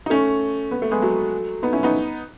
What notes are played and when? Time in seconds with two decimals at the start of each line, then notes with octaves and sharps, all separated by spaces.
0.06 D#4
0.10 A3 C#4
0.71 B3
0.82 A3
0.91 G#3 B3
1.02 F#3 A3
1.63 B3 D#4
1.73 C#4 E4
1.83 B3 D#4